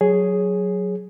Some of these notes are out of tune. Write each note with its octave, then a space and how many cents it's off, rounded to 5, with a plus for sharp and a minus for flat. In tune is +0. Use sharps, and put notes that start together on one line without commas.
F#3 +0 G#4 +0 C#5 +0